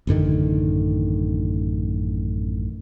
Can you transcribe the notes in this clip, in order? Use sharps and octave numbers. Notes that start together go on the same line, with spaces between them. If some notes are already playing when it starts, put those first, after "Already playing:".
A1 F#2 D3 D#3